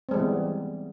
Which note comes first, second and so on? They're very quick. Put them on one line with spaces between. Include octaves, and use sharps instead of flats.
C4 G#3 G3 E3 B3